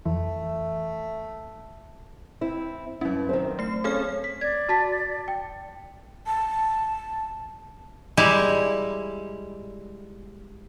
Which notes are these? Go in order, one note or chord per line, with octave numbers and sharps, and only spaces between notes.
F2 E3 A3
C4 E4
G2 F#3 C#4 E4
D#3 C4 C5
A3 C7
C4 C#4 G#4 A4 F6
B6
D5 G#6
F#4 A5 B6
G5
A5
G3 G#3 E4